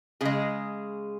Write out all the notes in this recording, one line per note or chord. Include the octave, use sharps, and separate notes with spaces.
C#3 G#3 G#4